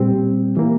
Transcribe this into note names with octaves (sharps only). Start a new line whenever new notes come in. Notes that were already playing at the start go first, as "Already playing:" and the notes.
Already playing: A#2 G3 C4 G4
E3 A#3